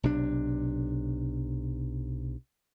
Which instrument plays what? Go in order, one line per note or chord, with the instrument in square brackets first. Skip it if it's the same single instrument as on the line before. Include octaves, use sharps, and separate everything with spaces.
[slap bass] B1 C3 D4